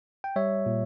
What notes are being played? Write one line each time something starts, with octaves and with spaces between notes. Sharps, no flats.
G5
G3 C#5 E5
A#2